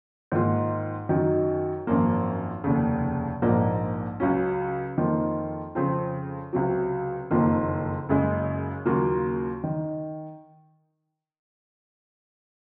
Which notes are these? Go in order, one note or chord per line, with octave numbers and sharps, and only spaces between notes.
G#2 D#3 A#3 F4
F#2 D#3 F#3
G#1 F#2 F3 A#3 F4
F1 D#2 C#3
A#1 G#2 F3 A#3
C#2 C#3 F#3 C#4
F2 D#3 A#3 F4
F2 C#3 F3 C4 F4
C#2 C3 F#3
F#1 F2 D#3 A#3 F4
F#1 F#2 C#3 G#3
D#2 C#3 F#3 A#3 F4
D#3